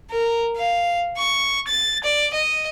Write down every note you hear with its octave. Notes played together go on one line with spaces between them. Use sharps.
A#4
F5
C#6
A6
D5
D#5